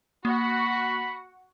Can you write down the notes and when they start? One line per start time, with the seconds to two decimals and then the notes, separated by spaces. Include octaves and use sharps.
0.25 A#3 F#4 F#5 B5